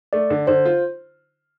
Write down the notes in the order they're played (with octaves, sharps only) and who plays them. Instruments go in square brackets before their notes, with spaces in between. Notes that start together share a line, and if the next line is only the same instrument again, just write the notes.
[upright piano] A3 [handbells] D5
[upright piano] D3
[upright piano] D3 [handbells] C5
[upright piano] F4